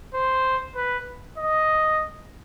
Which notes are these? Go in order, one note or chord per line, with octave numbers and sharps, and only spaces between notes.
C5
B4
D#5